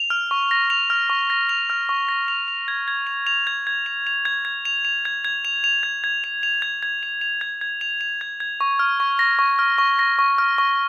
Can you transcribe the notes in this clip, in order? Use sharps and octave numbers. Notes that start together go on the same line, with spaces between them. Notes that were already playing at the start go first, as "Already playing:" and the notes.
Already playing: F7
F6
C#6
A#6
F7
F6
C#6
A#6
F7
F6
C#6
A#6
F7
F7
G#6
G#6
F7
F7
G#6
G#6
F7
F7
G#6
G#6
F7
F7
G#6
G#6
F7
F7
G#6
G#6
F7
F7
G#6
G#6
F7
F7
G#6
G#6
F7
F7
G#6
G#6
C#6
F6
C#6
A#6
C#6
F6
C#6
A#6
C#6
F6
C#6